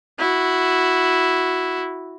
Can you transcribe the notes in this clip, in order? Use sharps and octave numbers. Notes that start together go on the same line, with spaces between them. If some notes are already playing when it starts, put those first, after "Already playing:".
E4 F#4